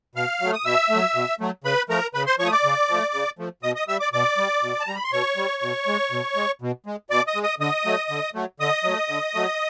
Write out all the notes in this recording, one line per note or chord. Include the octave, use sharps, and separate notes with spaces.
B2 F5 F6
F#3 A3
D#6
B2 E5 E6
A3
F#3
B2
F#3 A3
C#3 B4 B5
F3 A3 A#4 A#5
C#3 B4 B5
C5 C6
F3 A3 C#5 C#6 D#6
D5 D6
C#3
F3 A3
C#3
F3 A3
B2 D#5 D#6
D#5 D#6
G3 E5 E6
D5 D6
B2 D5 D6
G3
B2
A5
G3 A#5
B5
C6
B2 C#5 C#6
G3
B2
G#3
B2
G#3
B2
G#3
B2 D5 D6
D#5 D#6
G#3
D#5 D#6
D3 D#5 D#6
F#3 A3
D3
F#3 A3
D3 D#5 D#6
F#3 A3
D3
F#3 A3